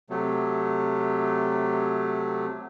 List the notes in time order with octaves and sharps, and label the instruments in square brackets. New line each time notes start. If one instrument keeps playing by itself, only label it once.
[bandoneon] C3 F#3 A3